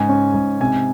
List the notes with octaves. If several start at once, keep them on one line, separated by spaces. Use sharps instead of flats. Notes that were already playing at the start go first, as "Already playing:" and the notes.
Already playing: G#2 C#3 G#5
C#4
G#2
C3 G#5